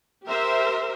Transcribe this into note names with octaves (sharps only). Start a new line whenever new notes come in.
G4 A#4 C5 E5